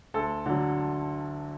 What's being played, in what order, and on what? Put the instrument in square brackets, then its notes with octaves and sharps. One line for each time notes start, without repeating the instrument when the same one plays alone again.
[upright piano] D2 A4
D3 F#3